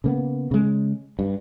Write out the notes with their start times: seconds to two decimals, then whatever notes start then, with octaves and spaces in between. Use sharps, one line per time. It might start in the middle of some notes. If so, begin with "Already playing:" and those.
0.04 C#3 A#3 B3
0.51 C#3 G#3
1.19 G2